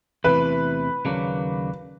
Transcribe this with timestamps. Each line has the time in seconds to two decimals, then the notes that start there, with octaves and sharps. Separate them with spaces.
0.24 E2 C3 E3 A3 B4
1.05 D#2 C#3 F#3 A#3 D4